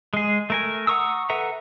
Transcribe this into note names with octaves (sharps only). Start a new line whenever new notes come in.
G#3 G#4
A3 A#4 G#5
F#5 A#5 C#6 D#6 E6
A4 B4 E5 F#5 A#5